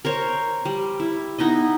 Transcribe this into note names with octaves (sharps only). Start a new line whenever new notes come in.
A#4 C5 C#5
G3
E4
B3 D#4 E4 D#5